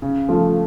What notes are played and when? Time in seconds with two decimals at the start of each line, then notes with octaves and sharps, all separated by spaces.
0.02 C#3
0.29 F3 A3